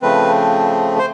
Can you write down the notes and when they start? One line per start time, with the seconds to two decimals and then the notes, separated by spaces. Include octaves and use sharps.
0.02 C#3 F3 A3 C4 B4
0.99 C5